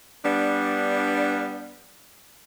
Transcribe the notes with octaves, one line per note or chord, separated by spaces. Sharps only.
G3 B3 D4